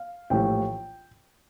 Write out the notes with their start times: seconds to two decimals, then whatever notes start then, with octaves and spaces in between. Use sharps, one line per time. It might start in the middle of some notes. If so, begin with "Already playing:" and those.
Already playing: F5
0.30 A#1 A2 E3 G3 G5